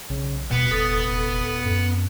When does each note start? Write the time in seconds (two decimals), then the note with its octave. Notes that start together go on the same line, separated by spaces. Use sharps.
0.10 B1 C#3
0.51 D#1 B2 B3
0.71 F1 A4 D#6
1.65 F#2